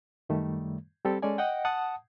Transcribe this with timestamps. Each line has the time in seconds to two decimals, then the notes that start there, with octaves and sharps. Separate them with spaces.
0.29 F#2 D#3 G3 A3
1.05 G3 C4 G4 A4
1.22 G#3 C#4 A4 D5 G#5
1.38 D#5 F#5 G5
1.65 F#5 A5 D#6